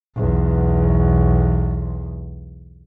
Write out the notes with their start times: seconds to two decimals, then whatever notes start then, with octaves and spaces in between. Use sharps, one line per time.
0.16 B1 E2